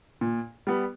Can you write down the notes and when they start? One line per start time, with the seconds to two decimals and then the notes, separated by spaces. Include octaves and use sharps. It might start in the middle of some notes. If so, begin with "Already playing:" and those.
0.21 A#2
0.67 G3 B3